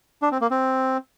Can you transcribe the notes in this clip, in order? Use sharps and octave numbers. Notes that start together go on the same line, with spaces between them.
D4
C4
A#3
C4